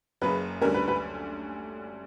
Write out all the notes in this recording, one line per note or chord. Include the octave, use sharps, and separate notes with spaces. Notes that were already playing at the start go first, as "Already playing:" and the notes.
F#1 F#2 C#3 B4
D2 D3 G3 C#4 A#4
B4
B4